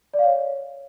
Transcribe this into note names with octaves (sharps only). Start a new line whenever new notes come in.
D5
F5
C#5